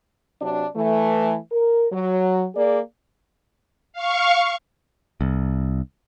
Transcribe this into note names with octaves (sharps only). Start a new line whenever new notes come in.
C3 F#3 D4
E3 A3
A#4
F#3
A#3 G#4 D5
F5 C#6
C2